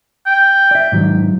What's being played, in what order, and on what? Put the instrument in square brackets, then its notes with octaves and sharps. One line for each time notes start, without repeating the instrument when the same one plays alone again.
[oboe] G5
[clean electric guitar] D5 E5
G#2 D#3 F#3